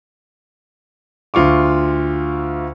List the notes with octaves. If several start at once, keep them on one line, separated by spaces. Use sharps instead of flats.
D2 F4 C#6 D6